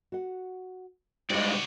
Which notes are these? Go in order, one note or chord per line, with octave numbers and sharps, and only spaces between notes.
F#4 F#5
G2 G#3 F#4 C5 D5 D#5